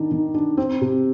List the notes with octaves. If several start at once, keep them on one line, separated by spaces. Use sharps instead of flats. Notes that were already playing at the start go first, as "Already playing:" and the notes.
Already playing: D#3 D4
D#3
D4
C4
C3